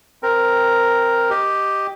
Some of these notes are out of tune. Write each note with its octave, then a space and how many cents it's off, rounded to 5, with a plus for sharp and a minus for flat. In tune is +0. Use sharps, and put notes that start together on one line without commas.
C4 +0 A#4 +0
G4 +0 D#5 +0